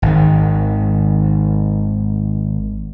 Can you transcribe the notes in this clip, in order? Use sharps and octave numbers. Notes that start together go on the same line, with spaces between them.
G#1 D#3